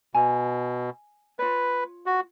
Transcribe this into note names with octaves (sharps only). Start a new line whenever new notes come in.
B2 G#5 A#5
F4 B4 C#5
F#4